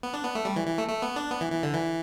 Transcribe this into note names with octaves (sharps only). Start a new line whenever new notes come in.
B3
D4
B3
A3
G3
E3
E3
A3
A3
B3
D4
B3
E3
E3
D3
E3